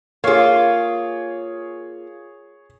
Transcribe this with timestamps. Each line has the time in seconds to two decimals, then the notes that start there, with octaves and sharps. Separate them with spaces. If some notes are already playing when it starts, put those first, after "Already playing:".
0.24 A#3 F4 G#4 C#5